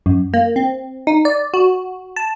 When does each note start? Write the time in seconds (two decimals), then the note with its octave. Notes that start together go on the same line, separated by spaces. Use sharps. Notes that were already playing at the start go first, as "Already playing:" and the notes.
0.06 F#2
0.34 A#3
0.56 C4
1.07 D#4
1.25 D5
1.54 F#4
2.16 A5